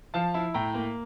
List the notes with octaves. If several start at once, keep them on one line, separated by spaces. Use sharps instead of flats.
F3 F5 A5
E4
A2 G5 A#5
A#3